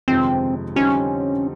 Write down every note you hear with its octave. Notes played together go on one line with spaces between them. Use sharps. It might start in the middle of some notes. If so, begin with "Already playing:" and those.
G1 F2 C3 D#3 G#3 C4
F2 D3 G3 C4 C#4 D#4